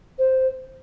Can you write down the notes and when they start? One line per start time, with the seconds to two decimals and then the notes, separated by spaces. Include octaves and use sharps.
0.18 C5